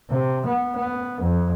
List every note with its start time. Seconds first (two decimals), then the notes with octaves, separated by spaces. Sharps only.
0.10 C3
0.46 B3
0.76 B3
1.21 F2